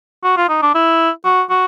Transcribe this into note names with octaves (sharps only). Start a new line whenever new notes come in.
F#4
F4
D#4
D4
E4
F#4
F#4